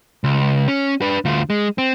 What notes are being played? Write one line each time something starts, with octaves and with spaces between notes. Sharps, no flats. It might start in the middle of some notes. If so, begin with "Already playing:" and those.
C#2
C#4
D4 B4
D2 F4
G#3
C4